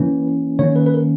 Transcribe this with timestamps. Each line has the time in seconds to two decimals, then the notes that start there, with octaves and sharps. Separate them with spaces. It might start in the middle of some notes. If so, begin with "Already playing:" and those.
Already playing: E3 A#3 C#4 B4
0.59 D#3 A#3 C#4 C#5
0.76 B4
0.86 B4
0.94 A#4